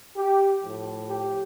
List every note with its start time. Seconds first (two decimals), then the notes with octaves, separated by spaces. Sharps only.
0.16 G4
0.62 A2 F3
1.10 G4